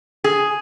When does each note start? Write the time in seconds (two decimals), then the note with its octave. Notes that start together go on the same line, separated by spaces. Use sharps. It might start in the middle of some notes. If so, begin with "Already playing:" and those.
0.24 G#4